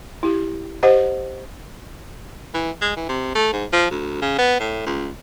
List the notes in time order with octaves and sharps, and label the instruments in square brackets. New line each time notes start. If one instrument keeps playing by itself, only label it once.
[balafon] E4 G4
G4 C5 D#5 F#5
[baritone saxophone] E3
G#3
E3
C3
A3
G#2
F3
D2
C#3
B3
A2
C#2